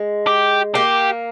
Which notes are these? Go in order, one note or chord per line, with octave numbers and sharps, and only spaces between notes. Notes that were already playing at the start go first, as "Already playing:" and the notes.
Already playing: G#3
G4
A#3 G4